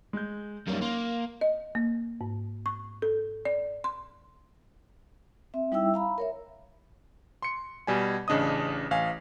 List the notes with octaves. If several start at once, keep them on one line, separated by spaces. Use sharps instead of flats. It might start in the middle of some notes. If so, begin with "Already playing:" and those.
G#3 G6
F#2 G3 A#3 C#4 D#4
A#3 C6
D#5
A#3
G#2
C#6
A4
D5
C6
C4 E5
G3 D#4 E4 E5 G5 E6
F5 A#5 B5
A#4 C#5 E5
C6 C#7
B2 G3 G#5
A1 C#3 D4 D#5 D#6
A1 F5 G#5